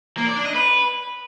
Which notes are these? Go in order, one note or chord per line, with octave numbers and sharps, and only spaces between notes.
A#3
D5
D4
D#5
B4